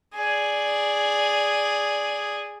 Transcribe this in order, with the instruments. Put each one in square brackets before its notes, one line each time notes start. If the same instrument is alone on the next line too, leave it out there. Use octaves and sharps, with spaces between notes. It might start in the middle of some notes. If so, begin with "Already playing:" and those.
[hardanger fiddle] G#4 D5